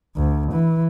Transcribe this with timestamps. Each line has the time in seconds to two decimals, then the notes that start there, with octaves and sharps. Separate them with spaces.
0.17 D2
0.53 E3